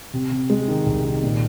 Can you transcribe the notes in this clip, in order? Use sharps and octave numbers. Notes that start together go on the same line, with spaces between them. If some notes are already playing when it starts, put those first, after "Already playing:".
C3
C3
G#3
D#3
C2
D#3
A#2